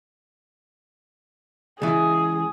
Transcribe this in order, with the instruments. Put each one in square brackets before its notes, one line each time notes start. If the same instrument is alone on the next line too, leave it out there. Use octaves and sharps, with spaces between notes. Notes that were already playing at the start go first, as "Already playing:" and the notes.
[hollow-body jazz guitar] C#2 E3 [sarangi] G#4